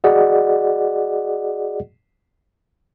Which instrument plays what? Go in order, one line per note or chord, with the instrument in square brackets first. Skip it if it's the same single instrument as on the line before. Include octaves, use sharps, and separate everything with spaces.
[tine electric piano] F#4 G#4 D5 D#5 F#5